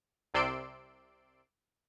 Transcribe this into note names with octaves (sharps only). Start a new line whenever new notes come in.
C2 C3 D5 C6 E6 D7